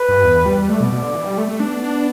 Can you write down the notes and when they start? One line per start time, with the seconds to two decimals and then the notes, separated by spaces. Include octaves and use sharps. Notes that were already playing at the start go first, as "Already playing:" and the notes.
Already playing: B4
0.09 G2
0.23 E2
0.46 G3
0.69 A3 D5
0.80 B2
0.92 B2
1.03 D3
1.15 E3
1.26 G3
1.38 A3
1.48 A3
1.60 B3 D4
1.83 D4